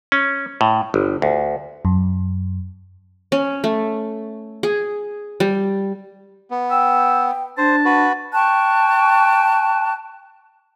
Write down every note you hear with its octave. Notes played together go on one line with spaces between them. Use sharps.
C#4
A2
G1
D2
F#2
C#4
A3
G#4
G3
B3
G5 E6
D4 C5 A5
F#4 B4
G5 A5 C#6 F#6